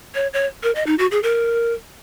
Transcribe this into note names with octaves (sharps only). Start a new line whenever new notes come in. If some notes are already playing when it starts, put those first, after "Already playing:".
C#5
C#5
A#4
D#5
D#4
F#4
G#4
A#4